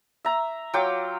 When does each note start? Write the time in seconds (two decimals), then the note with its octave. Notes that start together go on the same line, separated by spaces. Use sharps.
0.25 E5 A#5
0.74 F#3 F4 G5 D6